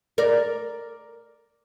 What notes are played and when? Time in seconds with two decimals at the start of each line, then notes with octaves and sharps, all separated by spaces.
0.18 A#4 D5